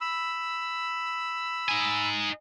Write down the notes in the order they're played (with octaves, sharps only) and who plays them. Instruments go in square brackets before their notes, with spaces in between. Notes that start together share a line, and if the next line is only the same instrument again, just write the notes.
[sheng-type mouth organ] B5 E6
[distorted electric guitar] D#4 G#5